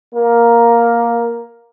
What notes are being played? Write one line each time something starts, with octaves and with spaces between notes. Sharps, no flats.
A#3 A#4